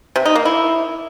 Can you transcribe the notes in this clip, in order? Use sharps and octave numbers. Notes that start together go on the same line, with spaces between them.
C3
D#4
A#3
E4